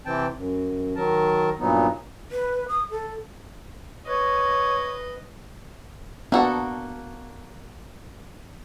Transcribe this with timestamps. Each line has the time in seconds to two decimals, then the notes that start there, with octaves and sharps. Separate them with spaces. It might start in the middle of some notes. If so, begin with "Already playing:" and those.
0.06 C3 E3 C4 G5 A5
0.36 F#2
0.95 D#3 F#3 A#4 A5
1.59 G2 A#2 F#3 B3 D#4
2.31 B4
2.68 D#6
2.91 A4
4.06 B4 C#5 D#5
6.32 A#3 B3 D4 F#4 A4